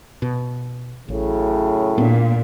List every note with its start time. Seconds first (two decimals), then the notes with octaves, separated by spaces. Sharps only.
0.22 B2
1.08 A1 F#2 A2 C#3
1.98 A#2 B3 D4